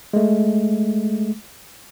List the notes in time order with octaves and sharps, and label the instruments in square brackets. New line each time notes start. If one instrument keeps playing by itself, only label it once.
[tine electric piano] G#3 A3